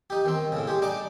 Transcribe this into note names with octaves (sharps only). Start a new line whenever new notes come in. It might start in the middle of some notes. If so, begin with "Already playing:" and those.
D#4 G4
D#3 C4
A2 C#3
G#3 G4
D4 D#4 D6